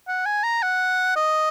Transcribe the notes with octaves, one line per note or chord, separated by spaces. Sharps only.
F#5
G#5
A#5
F#5
D#5